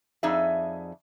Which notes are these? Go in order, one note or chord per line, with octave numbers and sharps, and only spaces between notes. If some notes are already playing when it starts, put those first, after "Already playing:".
F2 D#4 G#4 D5 E5